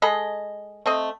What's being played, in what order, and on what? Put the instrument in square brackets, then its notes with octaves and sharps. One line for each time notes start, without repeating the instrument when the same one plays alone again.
[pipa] G#3 A4 D#5 B5
A3 C4 D#5